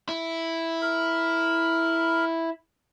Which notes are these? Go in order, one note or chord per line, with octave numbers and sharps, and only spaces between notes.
E4
A#4 B5